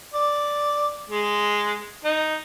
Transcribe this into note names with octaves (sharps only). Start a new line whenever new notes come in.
D5
G#3
D#4